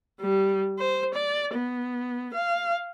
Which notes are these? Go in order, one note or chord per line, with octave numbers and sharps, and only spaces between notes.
G3
C5
D5
B3
F5